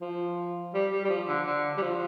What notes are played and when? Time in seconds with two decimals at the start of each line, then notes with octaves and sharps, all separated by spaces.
0.01 F3
0.74 G3
0.92 G3
1.05 G3
1.09 F3
1.28 D3
1.46 D3
1.77 G3
1.82 F3